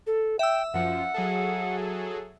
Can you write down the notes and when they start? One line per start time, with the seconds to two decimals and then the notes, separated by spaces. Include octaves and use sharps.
0.07 A4
0.39 E5 G5 E6
0.74 F#2 F3 F#5
1.14 F#3 G#4 A4